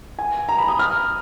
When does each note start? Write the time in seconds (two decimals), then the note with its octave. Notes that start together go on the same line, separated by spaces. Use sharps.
0.19 G#5
0.49 A#5
0.58 B5
0.68 D#6
0.79 F6